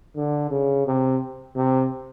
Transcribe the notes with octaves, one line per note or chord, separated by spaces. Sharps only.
D3
C#3
C3
C3